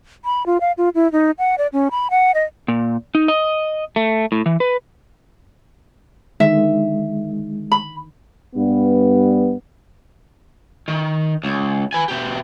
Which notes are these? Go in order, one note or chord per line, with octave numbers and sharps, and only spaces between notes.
B5
F4
F5
F4
E4
D#4
F#5
D5
C#4
B5
F#5
D#5
A#2
D#4
D#5
A3
A2
E3
B4
D3 D#3 G#3 E5
B5
G2 G3 B3
D#3
C#2
B4 G#5
B2 G4